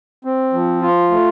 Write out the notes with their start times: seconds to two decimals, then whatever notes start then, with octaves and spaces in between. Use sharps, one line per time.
0.25 C4
0.53 F3
0.82 F4
1.11 A3